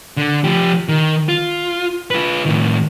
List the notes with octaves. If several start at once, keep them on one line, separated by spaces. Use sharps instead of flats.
D3
F3 G4
D#3
F4
F4 B4
A2 D#3